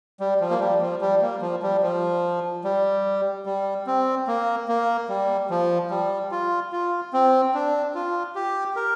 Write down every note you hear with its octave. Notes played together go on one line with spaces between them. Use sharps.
G3
F3
A#3
G3
F3
G3
A#3
F3
G3
F3
G3
G3
C4
A#3
A#3
G3
F3
G3
F4
F4
C4
D4
F4
G4
A#4